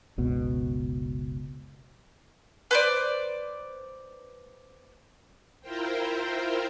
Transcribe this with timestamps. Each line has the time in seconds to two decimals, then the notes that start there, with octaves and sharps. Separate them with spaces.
0.18 F#1 C#2 B2
2.71 B4 C5 D5
5.61 E4 F4 A#4 C5 G5